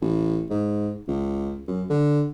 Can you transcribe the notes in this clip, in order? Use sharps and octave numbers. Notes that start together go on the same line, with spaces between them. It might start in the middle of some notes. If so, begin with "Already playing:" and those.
A1
G#2
C#2
F#2
D3